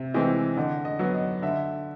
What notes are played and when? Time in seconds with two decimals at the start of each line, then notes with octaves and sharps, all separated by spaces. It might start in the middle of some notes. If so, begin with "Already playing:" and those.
Already playing: C3 E5
0.14 E3 G#3 C4 D#5
0.57 D3 D#5
0.85 D#5
0.99 F#3 B3
1.14 D#5
1.42 D3 E5